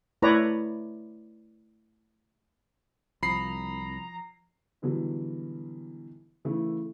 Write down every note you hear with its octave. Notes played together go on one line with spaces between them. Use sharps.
A3 E4 B4 C#5 D5 A#5
C2 F3 A#5 B5 D#6 C7
B2 D3 E3 F#3 G3
C#3 E3 A3 E4